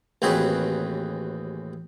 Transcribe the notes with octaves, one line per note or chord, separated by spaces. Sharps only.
A1 D#2 C4 F#4 G#4 B4